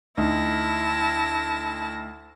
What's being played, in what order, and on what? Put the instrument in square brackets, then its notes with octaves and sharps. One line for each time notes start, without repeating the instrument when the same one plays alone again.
[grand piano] D2 D#4 [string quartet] E4 A5 A#6